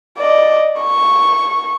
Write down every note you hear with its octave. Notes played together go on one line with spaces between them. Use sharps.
D5 D#5
C#6